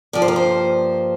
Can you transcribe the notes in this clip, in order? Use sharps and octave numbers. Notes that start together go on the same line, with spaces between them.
G2 F3 A#3 D5
C5
A#4
C5